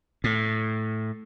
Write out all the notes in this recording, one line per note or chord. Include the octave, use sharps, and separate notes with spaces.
A2